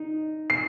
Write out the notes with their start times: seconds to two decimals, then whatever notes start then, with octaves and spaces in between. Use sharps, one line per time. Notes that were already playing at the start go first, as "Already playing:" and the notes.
Already playing: D#4
0.50 C7